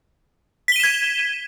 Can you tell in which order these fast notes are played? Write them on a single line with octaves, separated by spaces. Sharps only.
B6 G7 D#7 E7 G#6